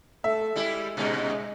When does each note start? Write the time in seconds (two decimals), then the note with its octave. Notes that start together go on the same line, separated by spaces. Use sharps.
0.24 A3 A4 E5
0.55 G3 G#3 E4 G4
0.97 A#2 C#3 G#3 D#4 D#5